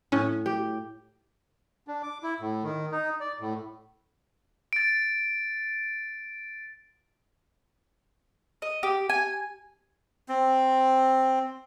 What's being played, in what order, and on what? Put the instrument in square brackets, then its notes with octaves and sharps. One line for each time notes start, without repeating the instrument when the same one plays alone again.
[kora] A2 [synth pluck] C#4
[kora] G4
[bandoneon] D4
D6
E4
A2
D#3
D#4
D5
A2
[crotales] A6 D7
[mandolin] D#5
G4
G#5
[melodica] C4